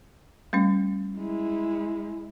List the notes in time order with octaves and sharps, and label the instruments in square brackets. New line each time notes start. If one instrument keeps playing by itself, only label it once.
[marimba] G3 A3 C#4
[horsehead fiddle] G#3 E4